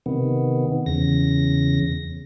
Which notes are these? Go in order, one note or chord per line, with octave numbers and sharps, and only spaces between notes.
C3 D#3 B3
E2 C#3 A#6